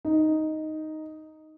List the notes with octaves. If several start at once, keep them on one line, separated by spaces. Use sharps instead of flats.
D#4